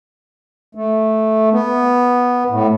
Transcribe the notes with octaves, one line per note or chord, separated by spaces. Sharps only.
A3
B3
A2